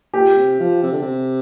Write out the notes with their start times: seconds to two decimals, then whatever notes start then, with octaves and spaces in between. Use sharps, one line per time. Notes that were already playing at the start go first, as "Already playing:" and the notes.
0.14 A#2 G4
0.37 C3
0.60 F3
0.83 C3
0.92 D3
1.02 C3